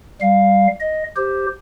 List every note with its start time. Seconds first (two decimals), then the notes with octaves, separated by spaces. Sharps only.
0.21 G3 F5
0.80 D#5
1.17 G4 C5